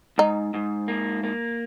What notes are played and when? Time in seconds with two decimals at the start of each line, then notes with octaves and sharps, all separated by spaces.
0.18 G#2 D#4
0.54 G#2
0.88 A#3
1.23 A#3